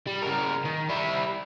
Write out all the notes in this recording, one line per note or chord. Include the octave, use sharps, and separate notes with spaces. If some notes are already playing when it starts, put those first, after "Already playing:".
G3
C#3 A#4
D#3
G3 E4